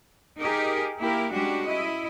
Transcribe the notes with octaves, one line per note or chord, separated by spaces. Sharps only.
D#4 G4 G#4 A#4
A#3 E4 G4 A#4
G3 G#3 C#4 D4 F#4 G4
E4 D#5